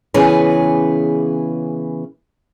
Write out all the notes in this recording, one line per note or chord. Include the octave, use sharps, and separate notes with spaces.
C#3 E3 B3 C#4 G#4 B4